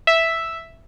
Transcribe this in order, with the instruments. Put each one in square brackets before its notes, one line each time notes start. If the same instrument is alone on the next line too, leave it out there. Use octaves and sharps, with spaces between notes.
[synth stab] E5